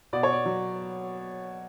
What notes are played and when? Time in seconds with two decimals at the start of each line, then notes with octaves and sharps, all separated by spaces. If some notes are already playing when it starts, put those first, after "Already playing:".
0.13 B2 D5
0.23 C#5
0.33 D5
0.46 F#3